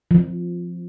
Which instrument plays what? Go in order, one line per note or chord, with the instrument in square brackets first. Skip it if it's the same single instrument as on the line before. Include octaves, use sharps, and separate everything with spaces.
[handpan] F3